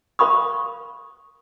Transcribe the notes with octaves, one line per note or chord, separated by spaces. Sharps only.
A#4 F5 B5 C#6 D#6